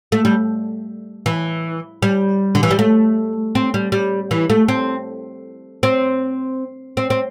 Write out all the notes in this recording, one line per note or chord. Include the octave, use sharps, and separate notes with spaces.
A3
G3
E3
G3
D3
E3
G3
A3
C4
G3
G3
E3
A3
C4
C4
C4
C4